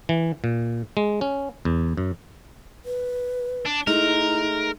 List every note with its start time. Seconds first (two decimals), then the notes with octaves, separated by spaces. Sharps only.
0.09 E3
0.44 A#2
0.97 G#3
1.21 C#4
1.65 E2
1.97 F#2
2.85 B4
3.66 D4
3.87 G#3 A3 D#4 E4 A#4